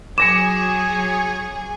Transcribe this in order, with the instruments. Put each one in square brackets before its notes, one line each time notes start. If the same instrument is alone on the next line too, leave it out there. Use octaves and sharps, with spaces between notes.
[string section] F#3 G#4 [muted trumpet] C#5 [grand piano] D6 A#6 C#7 [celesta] E7